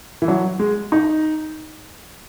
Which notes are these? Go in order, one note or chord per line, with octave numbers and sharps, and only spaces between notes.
E3
F#3
G#3
D#4